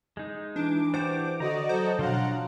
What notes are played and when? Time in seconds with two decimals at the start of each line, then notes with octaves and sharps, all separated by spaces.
0.17 G#3 D#4
0.56 E3 D4 D6
0.94 D4 F#4 G4 C5
1.40 D3 F#4 D5 D#5 A#5
1.69 F#3 F#4 A4 C5 D#5
1.99 B2 F3 D4 F5 F#5 A#5 C6